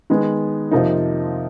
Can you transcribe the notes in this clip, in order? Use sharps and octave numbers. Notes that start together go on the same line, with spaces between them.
D#3 G#3 B3
F2 C3 F3 A#3 D#4